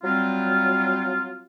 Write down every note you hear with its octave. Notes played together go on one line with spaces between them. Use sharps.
F#3 G3 C4 F4